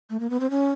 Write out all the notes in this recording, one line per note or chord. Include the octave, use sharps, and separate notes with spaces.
A3
A#3
B3
C4
C#4